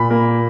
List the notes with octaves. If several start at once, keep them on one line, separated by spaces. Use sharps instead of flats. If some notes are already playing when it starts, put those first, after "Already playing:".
Already playing: A#2 B5
A#3